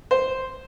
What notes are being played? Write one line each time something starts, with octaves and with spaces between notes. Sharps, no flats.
C5